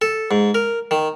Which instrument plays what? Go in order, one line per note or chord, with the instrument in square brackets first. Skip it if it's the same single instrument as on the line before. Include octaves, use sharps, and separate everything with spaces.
[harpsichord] A4
G#2
A#4
D#3